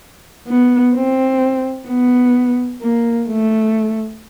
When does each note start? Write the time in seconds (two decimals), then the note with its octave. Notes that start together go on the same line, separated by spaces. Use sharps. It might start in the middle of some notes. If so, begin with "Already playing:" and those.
0.48 B3
0.95 C4
1.88 B3
2.81 A#3
3.28 A3